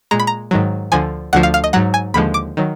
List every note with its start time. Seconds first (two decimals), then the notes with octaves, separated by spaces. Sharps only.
0.11 A#2 G#3 A#5
0.20 B5
0.27 A#5
0.51 G#2 D#3 F#3
0.92 D2 D3 F3 G#5
1.33 D2 D3 F3 F#5
1.43 F5
1.54 F5
1.64 D#5
1.73 G#2 F#3 F#5
1.94 G#5
2.14 D#2 D3 F3 G#3 B5
2.34 D6
2.57 D#3 F#3